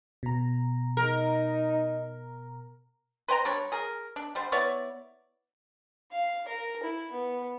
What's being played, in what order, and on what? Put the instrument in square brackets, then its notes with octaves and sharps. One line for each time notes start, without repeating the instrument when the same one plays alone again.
[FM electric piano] B2 A#5
[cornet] D#4 [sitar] A#4
[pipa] B4 C5 G5 A#5
G3 D4 C#5
G#4 A#4
D4
D3 G3 C5
B3 E4 C#5 D5
[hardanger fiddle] F5
A#4
E4
B3